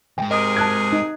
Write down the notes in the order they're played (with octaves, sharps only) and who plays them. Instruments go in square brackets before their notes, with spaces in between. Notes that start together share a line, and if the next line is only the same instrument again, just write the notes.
[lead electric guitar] D#2 G#2 [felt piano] G5
[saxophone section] C3 G#4 A#4 [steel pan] D#5
[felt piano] A5 F#6 G#6
[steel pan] D#4